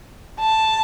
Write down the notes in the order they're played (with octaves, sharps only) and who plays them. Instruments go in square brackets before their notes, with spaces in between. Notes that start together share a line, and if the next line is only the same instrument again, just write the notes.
[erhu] A5